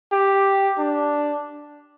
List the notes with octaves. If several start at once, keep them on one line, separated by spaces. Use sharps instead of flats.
G4
D4